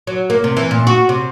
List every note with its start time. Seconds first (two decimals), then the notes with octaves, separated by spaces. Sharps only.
0.07 F#3
0.30 A#3
0.44 C3
0.57 E3
0.71 A#2
0.87 F#4
1.09 C3